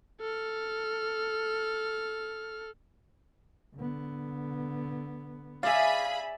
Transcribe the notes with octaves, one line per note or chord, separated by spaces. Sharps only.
A4 F6
D3 B3
G#4 D5 E5 F5 B5